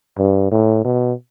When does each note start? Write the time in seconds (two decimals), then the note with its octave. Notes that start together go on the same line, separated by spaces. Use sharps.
0.18 G2
0.51 A2
0.84 B2